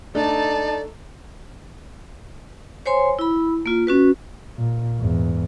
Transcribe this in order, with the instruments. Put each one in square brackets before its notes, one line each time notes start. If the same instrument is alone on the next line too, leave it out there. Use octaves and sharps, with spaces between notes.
[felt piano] A3 D4 A4 [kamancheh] D#4 A5 [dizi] D5
[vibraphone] C5 C#5 G#5 C6
E4 B5
A#3 F4
C#4 F#4 B4
[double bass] A#2
E2 G#2